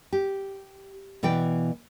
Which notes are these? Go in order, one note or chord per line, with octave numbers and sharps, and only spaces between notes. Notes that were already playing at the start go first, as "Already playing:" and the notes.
G4
B2 E3 D5 G5